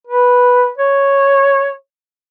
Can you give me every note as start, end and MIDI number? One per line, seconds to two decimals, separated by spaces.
0.07 0.68 71
0.78 1.72 73